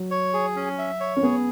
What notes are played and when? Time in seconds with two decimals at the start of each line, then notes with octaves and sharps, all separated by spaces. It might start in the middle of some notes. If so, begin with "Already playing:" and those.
Already playing: F#3
0.11 C#5
0.33 G#4
0.56 C#4
0.78 E5
1.00 C#5
1.17 C#4
1.23 B3 G#4